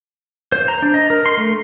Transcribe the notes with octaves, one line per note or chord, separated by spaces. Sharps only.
C5
A#5
D4
D#5
A#4
C6
A3